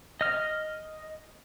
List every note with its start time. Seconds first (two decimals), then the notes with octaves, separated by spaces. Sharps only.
0.21 D#5 F6